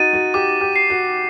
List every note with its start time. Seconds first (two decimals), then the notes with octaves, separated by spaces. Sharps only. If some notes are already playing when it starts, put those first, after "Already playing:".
Already playing: D#4 F#4 A6 D#7
0.13 F#4
0.34 G4 D6
0.61 G4
0.76 C7
0.90 F#4